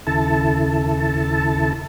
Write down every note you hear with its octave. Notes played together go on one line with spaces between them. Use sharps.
D#2 C#3 E4 A4 A5